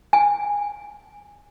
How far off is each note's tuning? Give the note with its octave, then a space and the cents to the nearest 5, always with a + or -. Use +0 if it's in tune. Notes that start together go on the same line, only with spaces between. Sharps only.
G#5 -15